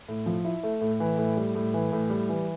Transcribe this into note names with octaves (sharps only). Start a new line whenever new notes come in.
A2
F3
E4
A3
A2
E3
A2
G3
A2
E3
A2
G3
E3